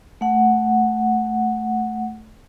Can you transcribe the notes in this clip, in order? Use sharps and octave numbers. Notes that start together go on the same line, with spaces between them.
A3 F#5